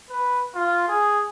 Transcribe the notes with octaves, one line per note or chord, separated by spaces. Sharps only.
B4
F4
G#4